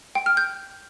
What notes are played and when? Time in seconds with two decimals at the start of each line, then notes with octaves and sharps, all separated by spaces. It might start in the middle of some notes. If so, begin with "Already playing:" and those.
0.15 G5
0.26 F6
0.37 G6